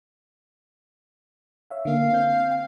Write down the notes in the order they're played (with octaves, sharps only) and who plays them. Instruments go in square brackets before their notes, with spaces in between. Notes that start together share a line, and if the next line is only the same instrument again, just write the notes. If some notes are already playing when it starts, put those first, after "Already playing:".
[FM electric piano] C#5 E5 F5
[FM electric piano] D3 A#3 C#4 [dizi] F5
[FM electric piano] C4 G6
G5